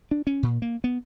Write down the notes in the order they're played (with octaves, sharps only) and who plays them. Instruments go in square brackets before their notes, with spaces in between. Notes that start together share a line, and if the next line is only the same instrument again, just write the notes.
[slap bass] D4
C#4
A#2
A#3
B3